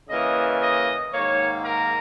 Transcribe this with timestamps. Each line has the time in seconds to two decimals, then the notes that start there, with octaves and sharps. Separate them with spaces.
0.10 C#3 E3 A#3 D#5
0.62 D#5
1.12 G#2 D#3 A#3 C#5
1.64 A#4